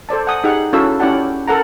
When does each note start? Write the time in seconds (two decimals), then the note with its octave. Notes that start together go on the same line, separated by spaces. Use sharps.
0.09 A4 C5 D5 A5
0.27 F#5 G#5 D#6
0.44 D#4 G4 G#4 F#5
0.73 C#4 E4 F#4 A4 F5 E6
1.00 C#4 E4 G4 D5 F#5 A5
1.48 A4 A#4 F#5 A#5